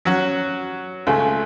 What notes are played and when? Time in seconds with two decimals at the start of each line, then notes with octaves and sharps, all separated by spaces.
0.05 F#3 C#4 F#4
1.07 C#2 C#3 A3